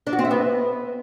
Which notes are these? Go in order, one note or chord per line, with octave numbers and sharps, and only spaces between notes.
D4
F#4
C4
E5
B3